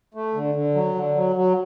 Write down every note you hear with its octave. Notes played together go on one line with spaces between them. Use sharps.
A3
D3
D3
F#3
D3
F#3
F#3